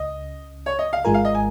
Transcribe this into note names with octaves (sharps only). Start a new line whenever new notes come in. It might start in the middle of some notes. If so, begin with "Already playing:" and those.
Already playing: C#2 C#3 D#5
C#5
D#5
F5
G#1 G#2 G#3 F4 A#4 G#5
F5
D#5
G#5